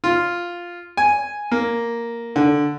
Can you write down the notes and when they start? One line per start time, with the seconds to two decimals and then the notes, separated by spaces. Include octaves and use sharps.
0.04 F4
0.97 G#5
1.52 A#3
2.36 D3